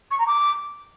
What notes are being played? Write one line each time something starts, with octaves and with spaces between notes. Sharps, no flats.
C#6
A#5
D6